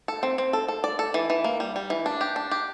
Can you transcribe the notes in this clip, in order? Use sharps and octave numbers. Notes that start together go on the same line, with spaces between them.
A4
C4
C4
A4
A4
D5
A4
E3
E3
A#3
G3
G3
E3
D4
G4
D4
G4